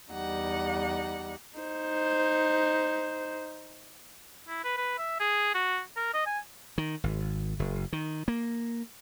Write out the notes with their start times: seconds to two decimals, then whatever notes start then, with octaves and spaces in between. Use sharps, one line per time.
0.12 E2 G3 D#4 F#5
1.59 D#4 C5
4.48 E4
4.64 B4
4.77 B4
4.98 E5
5.20 G#4
5.54 F#4
5.96 A#4
6.14 D#5
6.26 G#5
6.78 D#3
7.04 G#1
7.59 F#1
7.93 D#3
8.28 A#3